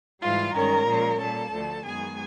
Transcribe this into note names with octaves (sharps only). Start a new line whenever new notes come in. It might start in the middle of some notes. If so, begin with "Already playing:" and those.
G#2 E3 G3 F4 F5
G2 D#3 G#3 C#4 A#4 A#5
A#2 F3 G#3 C#4
A#2 G3 A#3 A4 A5
D2 D3 F3 A3
F#2 D#3 G#3 B3 G#4 G#5